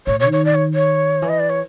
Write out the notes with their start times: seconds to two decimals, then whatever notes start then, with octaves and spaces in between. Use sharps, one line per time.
0.06 A2 C#5
0.20 C#5
0.26 D#3
0.32 C#5
0.45 D5
0.55 C#5
0.74 C#5
1.22 E3
1.29 D#5
1.40 D5
1.50 C#5